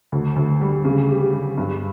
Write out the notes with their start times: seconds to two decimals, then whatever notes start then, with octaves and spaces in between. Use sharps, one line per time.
0.12 D2
0.36 D2
0.61 G3
0.85 C#3
1.09 G4
1.33 G3
1.58 G2